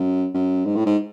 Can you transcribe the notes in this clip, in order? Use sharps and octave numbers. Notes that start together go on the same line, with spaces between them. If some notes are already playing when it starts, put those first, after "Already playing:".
Already playing: F#2
F#2
G#2
A2
G#2